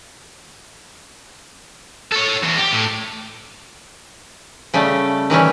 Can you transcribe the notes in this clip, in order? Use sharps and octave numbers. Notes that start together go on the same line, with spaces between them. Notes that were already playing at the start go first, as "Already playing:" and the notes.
A4 C#5
E2
G4
A2
C#3 G3 A3
D#3 E3 G3 C#4